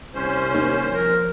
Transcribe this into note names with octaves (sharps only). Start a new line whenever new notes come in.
C2 C#4 C5
D#2
F3 A#4